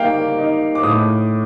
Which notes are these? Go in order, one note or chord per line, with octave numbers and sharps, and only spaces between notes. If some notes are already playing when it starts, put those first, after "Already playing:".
Already playing: G3 A#3 D#4 F5 G5
D#4
D6
A2 D#6